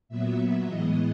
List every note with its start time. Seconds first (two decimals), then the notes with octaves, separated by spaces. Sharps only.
0.09 A#2 F#3 B3 E5
0.66 A2 E3 G#3 B3 D#5